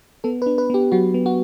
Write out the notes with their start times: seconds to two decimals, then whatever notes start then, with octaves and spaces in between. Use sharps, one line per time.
0.24 B3 A4
0.42 B4
0.46 D4
0.58 B4
0.70 B3 G4
0.92 F#3 F#4
1.14 B3
1.26 F#4